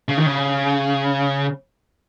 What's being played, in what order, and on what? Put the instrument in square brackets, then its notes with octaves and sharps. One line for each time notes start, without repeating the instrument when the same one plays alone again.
[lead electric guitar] C#3
D#3
C#3